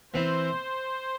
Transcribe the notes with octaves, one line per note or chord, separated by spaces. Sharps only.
E3 C4 E4 C5